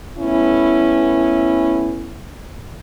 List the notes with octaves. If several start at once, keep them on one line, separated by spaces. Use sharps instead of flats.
A3 B3 C#4 E4